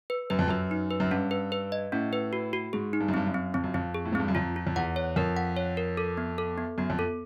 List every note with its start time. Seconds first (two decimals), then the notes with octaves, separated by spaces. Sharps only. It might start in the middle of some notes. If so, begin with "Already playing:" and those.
0.10 B4
0.30 F#2 B4
0.39 F2
0.48 F#2 B4
0.71 D#4
0.91 B4
1.00 F#2
1.11 G2 C#4
1.31 B4
1.52 B4
1.72 D#5
1.92 A2 C#4
2.13 B4
2.33 F#4
2.53 F#4
2.73 G#2 G#4
2.93 D#4
3.00 G2
3.08 F#2
3.14 G2 C4
3.27 F#2
3.34 C4
3.54 F2 C4
3.64 F#2
3.74 F2 C4
3.95 G#4
4.05 A2
4.12 G#2
4.15 G2 C4
4.28 F#2
4.35 F2 F4
4.56 F4
4.67 F2
4.76 E2 F#5
4.96 C#5
5.16 F2 A#4
5.37 F#5
5.57 C#5
5.77 A#4
5.97 A4
6.17 B3
6.38 A4
6.58 B3
6.78 F#2 B3
6.90 F2
6.99 A4